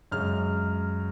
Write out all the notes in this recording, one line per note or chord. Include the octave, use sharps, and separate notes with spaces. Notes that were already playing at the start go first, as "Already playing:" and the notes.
F#2 C#3 G#3 F6